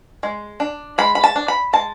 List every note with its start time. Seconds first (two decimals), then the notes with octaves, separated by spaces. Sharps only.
0.23 G#3
0.60 D4
0.98 G#3 B5
1.15 B5
1.24 A5
1.36 D4
1.48 B5
1.73 G#3 A5